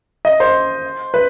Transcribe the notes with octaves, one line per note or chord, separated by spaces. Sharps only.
D#5
C5
B4